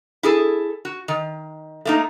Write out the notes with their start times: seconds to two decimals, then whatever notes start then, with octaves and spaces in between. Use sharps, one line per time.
0.23 E4 G#4 A4
0.85 F#4
1.08 D#3
1.85 A3 A#3 D#4